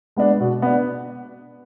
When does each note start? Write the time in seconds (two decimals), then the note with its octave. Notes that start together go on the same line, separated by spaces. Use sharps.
0.17 G#3 B3 D4
0.40 B2
0.62 B3 D4